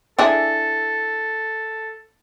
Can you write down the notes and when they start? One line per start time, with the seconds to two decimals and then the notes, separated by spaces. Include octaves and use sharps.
0.19 D4 E4 G#4 A4